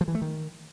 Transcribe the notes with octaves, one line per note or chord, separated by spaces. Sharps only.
F3
E3
A3
D#3